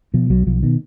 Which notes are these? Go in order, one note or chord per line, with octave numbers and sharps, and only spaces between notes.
B2 F3
B1 F#3
B1 F3
B2 D#3